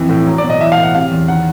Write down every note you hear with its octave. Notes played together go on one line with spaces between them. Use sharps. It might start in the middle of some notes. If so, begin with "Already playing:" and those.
Already playing: F2 E3
A2
F#3
D5
B2
D#5
E3 E5
F5
A2
F#5
C3 F5
E2
D#3 F#5